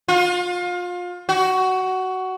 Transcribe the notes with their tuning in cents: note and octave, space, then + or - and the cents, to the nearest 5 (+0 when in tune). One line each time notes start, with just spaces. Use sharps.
F4 +30
F#4 +15